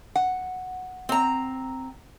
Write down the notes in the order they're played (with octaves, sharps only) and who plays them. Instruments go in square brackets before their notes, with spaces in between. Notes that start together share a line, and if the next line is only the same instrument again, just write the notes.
[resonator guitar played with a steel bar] F#5
[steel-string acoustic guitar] C4 A#5